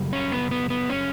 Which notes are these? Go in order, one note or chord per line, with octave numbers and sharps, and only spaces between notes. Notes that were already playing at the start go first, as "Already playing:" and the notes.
Already playing: F#2 C#3 G3
C#4
B3
B3
B3
C#4